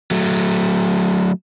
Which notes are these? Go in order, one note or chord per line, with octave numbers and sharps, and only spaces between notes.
F#3 A3